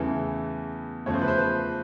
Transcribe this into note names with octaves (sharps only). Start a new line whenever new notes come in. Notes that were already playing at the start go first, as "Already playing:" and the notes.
Already playing: E2 C#3 E3 A3 C#4 A4
E2 C#3 F3 A3 C#5
C5
B4
C5
B4